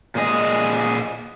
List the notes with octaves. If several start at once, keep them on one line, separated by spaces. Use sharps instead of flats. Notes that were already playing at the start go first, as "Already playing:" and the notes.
A#2 G#4 D#5